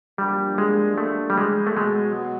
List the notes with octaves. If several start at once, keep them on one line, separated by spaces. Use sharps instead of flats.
F3 G3 A#3 D4 G4
G#3
A3
G3
G#3
A3
B2 F#3 G#3 B3